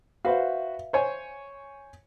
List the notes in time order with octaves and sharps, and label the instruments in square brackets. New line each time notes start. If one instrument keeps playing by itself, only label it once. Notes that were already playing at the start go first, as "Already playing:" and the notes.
[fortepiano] F#4 B4 C5 [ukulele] E5 F5
[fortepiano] C5 C#5 G#5